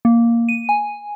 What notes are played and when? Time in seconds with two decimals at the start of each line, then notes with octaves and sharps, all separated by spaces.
0.05 A#3
0.49 D#7
0.69 G#5